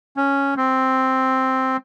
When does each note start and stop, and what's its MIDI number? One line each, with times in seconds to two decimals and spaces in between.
0.17 0.54 61
0.57 1.77 60